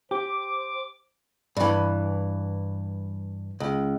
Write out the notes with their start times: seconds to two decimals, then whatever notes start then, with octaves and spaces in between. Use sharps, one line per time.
0.11 G4 C5 D6
1.57 G2 E3
3.60 C#2